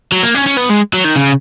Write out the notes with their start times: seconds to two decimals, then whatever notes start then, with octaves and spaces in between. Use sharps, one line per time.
0.12 F#3
0.23 A#3
0.35 C#4
0.47 C#4
0.57 B3
0.70 G#3
0.93 F#3
1.05 D#3
1.16 C#3